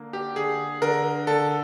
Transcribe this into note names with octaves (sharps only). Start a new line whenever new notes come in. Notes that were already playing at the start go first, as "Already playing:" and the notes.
Already playing: D3 A#3
G4
D3 G#4
D3 A#4
D3 A4